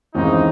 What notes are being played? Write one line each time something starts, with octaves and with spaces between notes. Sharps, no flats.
D#2 C#3 E3 G#3 C4 D#4